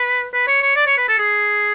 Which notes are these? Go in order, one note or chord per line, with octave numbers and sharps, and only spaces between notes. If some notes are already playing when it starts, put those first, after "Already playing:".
Already playing: B4
B4
C#5
C#5
D5
C#5
B4
A4
G#4